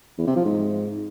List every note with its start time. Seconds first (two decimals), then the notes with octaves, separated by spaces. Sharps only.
0.18 E2
0.27 C3
0.36 F3
0.45 G#2